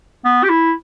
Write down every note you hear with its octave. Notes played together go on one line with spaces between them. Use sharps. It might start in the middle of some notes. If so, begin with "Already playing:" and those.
B3
G4
E4